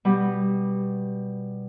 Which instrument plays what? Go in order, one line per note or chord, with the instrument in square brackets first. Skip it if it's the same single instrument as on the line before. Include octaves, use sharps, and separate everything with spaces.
[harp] B2 G3